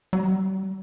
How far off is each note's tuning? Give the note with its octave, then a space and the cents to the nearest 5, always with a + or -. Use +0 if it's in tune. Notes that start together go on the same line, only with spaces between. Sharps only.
G3 -45